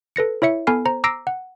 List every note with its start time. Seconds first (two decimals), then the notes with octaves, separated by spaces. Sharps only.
0.16 A4 B4 A#6 C#7
0.42 E4 C#5 E5 C#7
0.67 B3 A4 G#5 B5 F6 C7
0.85 C5 A#5
1.04 A#5 D6 E6 A#6 C7 D7
1.27 F#5